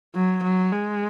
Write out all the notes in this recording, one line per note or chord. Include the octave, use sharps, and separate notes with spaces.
F#3
F#3
G#3